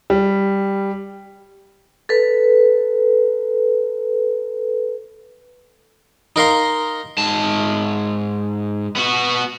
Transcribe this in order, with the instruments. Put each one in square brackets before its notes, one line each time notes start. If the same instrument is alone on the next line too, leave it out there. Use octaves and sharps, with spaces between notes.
[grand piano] G3
[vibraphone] A4 B4
[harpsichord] D#4 A#4 F5 C6
[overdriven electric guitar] G#2 A5
B3 F#4